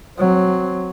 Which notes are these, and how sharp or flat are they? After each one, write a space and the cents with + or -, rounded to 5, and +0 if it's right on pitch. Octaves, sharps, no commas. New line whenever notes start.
F#3 +0 C4 +0